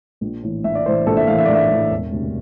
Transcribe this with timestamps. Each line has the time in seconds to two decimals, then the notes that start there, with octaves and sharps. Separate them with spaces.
0.21 A#1
0.43 A2 E3
0.64 A#1 E5
0.75 D5
0.86 A2 E3 C5
1.07 A#1 A4
1.17 E5
1.27 A2 F5
1.31 E3
1.38 E5
1.46 D5
1.48 A#1
1.55 E5
1.70 A2 E3
1.91 E1
2.12 D2 C3